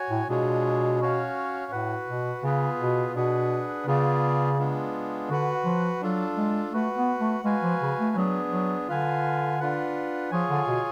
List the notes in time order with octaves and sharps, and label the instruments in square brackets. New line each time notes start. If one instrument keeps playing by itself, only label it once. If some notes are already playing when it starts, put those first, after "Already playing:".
Already playing: [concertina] F#4 C#5 G#5
[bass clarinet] A2
[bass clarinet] B2 [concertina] G#3 D4 F4 G#4 C#5
[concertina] C#4 F#4 C#5 F5
[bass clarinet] A2 [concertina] F#4 B4 F#5
[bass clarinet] B2
[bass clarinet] C#3 [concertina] B3 F4 G#4 B4
[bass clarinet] B2
[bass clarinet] B2 [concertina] D4 G#4 B4 F#5
[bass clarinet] C#3 [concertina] B3 F4 G#4 D5
[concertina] G#3 B3 D4 F4
[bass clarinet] D3 [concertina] F#4 B4 F#5
[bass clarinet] F3
[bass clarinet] F#3 [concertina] D4 F4 A4
[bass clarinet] G#3
[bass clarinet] A3 [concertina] F#4 B4 F#5
[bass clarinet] B3
A3
[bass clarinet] G#3 [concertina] F#4 B4 F5 G#5
[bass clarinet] F3
C#3
A3
[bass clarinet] F#3 [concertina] B3 D4 G#4
[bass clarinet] F#3
[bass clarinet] D3 [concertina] F4 B4 F5 G#5
[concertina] D4 F4 B4 F#5
[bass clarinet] F3 [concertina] F4 G#4 C#5 G#5
[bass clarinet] D3
B2